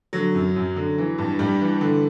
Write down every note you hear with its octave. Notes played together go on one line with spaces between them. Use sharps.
D3 F#3
F#2
F#2
D3
E3
G2
G2 G3
E3
D3